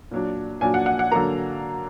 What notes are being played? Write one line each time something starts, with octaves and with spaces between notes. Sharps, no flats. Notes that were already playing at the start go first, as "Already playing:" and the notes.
A#2 F#3 D4
A#2 F#3 D4 G#5
F#5
F#5
F#5
D3 F#3 A#3 A#5